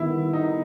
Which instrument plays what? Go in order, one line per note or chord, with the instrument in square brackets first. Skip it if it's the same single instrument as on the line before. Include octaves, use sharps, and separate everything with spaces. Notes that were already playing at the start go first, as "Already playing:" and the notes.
Already playing: [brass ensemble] D#3 G3 B3 [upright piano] E4
[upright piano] D#4